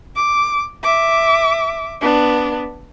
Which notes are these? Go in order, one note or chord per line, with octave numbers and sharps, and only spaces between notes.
D6
E5 D6
B3 D4